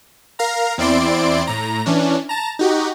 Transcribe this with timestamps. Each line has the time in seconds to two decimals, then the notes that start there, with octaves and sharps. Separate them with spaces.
0.39 A#4 F5 A#5
0.78 E2 C4 E4 D5 C6 D7
1.47 A2 A#5
1.86 E3 C#4 D4
2.29 A5 A#5
2.59 D#4 F#4 G4